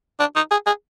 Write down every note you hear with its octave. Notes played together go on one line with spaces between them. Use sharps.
D4
D#4
G#4
G#4